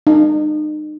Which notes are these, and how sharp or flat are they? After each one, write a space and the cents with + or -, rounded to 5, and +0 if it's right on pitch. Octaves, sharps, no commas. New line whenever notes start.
D#4 -35